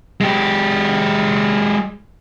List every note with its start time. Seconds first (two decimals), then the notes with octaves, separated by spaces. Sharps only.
0.21 G#3 G4